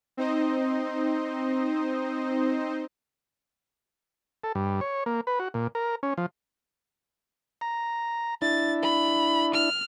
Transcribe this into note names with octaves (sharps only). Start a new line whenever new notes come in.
C4 D#4 C5 D#5
A4
G2
C#5
A#3
B4
F#4
A#2
A#4
C#4
F3
A#5
D4 E4 A6
B5
F6